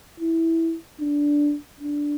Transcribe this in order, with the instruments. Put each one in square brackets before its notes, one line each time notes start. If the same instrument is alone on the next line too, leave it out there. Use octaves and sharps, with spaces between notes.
[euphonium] E4
D4
D4